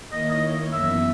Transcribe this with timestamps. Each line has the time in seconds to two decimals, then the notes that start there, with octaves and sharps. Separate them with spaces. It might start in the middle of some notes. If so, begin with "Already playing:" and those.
0.12 D#3 A#3 E4 A#4 C#5 D#5
0.31 D#5
0.72 F#2 E3 B3 E5